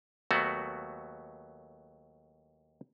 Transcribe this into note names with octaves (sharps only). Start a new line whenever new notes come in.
D#2 F#3 A3 B3 F#4